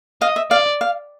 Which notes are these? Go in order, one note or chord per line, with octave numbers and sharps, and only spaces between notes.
D#5 F5
E5
D5 F5
F5